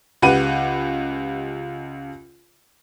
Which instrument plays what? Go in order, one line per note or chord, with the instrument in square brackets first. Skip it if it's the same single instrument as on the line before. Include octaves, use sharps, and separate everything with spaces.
[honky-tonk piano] C#2 G4 B4 F#5 D#7